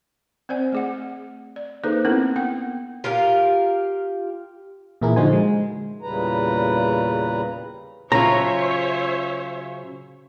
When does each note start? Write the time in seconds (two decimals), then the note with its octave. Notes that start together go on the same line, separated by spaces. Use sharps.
0.49 C4 C5 D5 G#5
0.72 A3 G#4 F#5
1.56 D5
1.84 A#3 D#4 G#4 A4 B4 C5
2.05 B3 C4 D4 E4 G#4 A#4
2.36 B3 F#5 G5
3.04 F4 G4 A#4 F5
5.02 A#2 E3 E4 G#4 A#4
5.16 D3 F3 D#4 F#4 C5 G#5
5.33 G#3
6.02 E2 A#2 C#3 G3 B4 A#5
8.12 C#3 F#3 F4 C5 C#5 E5 A#5